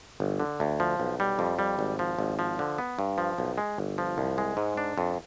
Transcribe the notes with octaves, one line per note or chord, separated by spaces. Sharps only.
G1
D3
D2
F3
B1
G3
F2
G3
G#1
F3
G#1
F3
D3
B3
G2
F3
B1
G#3
G1
F3
C2
G#3
G#2
D4
F2